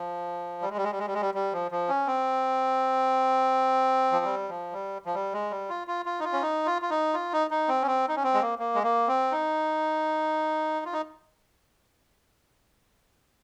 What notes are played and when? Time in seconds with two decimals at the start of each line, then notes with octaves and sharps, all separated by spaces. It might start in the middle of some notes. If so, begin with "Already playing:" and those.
Already playing: F3
0.62 G3
0.70 G#3
0.77 G3
0.84 G#3
0.92 G3
0.99 G#3
1.07 G3
1.14 G#3
1.21 G3
1.34 G3
1.53 F3
1.71 F3
1.89 C#4
2.07 C4
4.12 F3
4.25 G3
4.49 F3
4.73 G3
5.05 F3
5.14 G3
5.33 G#3
5.51 G3
5.69 F4
5.88 F4
6.06 F4
6.20 D#4
6.24 F4
6.33 C#4
6.42 D#4
6.66 F4
6.82 F4
6.90 D#4
7.14 F4
7.33 D#4
7.51 D#4
7.68 C4
7.82 C#4
7.87 C4
8.08 D#4
8.16 C#4
8.23 C4
8.34 G#3
8.41 A#3
8.59 A#3
8.75 G#3
8.83 A#3
9.08 C4
9.32 D#4
10.85 F4
10.93 D#4